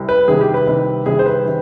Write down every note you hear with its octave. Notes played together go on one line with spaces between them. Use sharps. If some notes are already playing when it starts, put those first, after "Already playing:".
Already playing: C2 C3
B4
C2 C3 D#3 G#4
G4
B4
C2 C3 D#3
C2 C3 D#3 G#4
C5
B4
C3 D#3